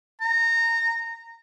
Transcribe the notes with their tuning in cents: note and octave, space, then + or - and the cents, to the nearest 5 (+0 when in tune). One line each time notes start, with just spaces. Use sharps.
A#5 -20